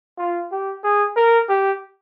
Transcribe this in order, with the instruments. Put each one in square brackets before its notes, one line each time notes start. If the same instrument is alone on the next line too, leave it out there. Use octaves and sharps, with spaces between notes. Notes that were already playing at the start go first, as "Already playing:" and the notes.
[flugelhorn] F4
G4
G#4
A#4
G4